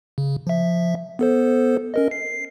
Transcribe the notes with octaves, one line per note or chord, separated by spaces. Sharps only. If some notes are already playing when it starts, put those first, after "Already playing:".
C#3
F3 E5
B3 A4 C5
C#4 A#4 D#5
C7